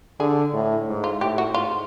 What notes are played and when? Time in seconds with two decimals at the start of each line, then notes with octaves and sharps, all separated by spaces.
0.20 D3 G#4
0.53 A2
0.88 G#2
1.04 F4
1.21 A2 G4
1.38 F#4
1.54 G#2 F4